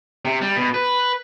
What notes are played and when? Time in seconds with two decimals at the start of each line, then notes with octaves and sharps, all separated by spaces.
0.25 C3
0.41 G3
0.56 B2
0.74 B4